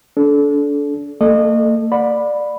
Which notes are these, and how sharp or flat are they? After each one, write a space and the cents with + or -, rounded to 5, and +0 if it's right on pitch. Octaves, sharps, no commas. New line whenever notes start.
D4 -30 A4 -25
A#3 -45 A4 +0 D#5 -30
D5 +15 F#5 -40 B5 +0